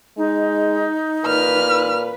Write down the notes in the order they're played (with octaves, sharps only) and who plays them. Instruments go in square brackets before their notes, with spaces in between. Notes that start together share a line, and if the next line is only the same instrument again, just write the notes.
[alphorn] G#3 [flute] D#4
[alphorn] A#2 [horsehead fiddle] B4 [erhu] F6